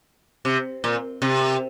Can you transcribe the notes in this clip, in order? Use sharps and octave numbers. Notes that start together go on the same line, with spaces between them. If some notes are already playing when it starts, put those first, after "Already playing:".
C3
A#2
C3